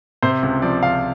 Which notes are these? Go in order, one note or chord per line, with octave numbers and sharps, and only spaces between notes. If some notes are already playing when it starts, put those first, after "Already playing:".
C3 C5
C#2
F3 D5
C#2 F5